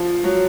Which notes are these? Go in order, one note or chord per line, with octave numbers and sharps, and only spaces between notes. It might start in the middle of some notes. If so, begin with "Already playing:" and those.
Already playing: F3
F#3